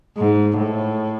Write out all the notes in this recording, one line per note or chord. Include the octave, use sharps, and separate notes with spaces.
G#2
A2